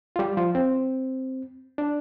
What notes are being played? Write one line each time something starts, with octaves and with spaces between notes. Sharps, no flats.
F4
G3 G4
F3 F4
C4
D4